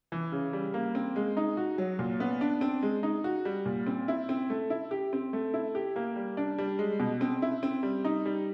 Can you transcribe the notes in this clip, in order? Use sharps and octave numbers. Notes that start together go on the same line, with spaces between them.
E3
C#3
G3
A#3
C4
G#3
D#4
F#4
F#3
A#2
B3
D4
C4
G#3
D#4
F#4
G3
A#2
C4
E4
C4
A3
E4
G4
C4
A3
E4
G4
A#3
G3
D4
G3
G#3
B2
C4
E4
C4
G3
D#4
G3